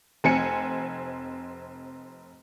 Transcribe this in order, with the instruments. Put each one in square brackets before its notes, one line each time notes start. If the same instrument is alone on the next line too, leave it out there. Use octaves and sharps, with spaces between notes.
[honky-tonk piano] F1 C4 G#5 C#7